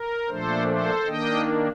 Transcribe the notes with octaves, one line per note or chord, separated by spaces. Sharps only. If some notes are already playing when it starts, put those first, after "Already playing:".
Already playing: A#4
A#2 F3 A3 D4 A4 C5
A4 C5
D#3 A#3 D4 D#5 G5